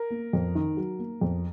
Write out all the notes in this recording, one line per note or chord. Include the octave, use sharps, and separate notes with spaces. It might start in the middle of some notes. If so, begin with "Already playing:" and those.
Already playing: A#4
A#3
F2
D#3
F#3
A#3
F2